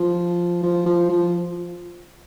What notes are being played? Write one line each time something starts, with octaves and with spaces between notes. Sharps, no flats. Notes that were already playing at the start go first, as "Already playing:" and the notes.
Already playing: F3
F3
F3
F3